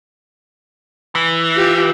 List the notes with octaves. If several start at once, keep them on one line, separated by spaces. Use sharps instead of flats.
E3
F4 G4